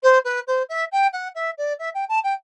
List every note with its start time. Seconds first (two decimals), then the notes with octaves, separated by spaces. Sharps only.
0.02 C5
0.24 B4
0.47 C5
0.68 E5
0.91 G5
1.12 F#5
1.34 E5
1.57 D5
1.79 E5
1.94 G5
2.08 A5
2.23 G5